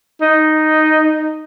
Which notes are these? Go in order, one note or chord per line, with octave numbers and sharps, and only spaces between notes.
D#4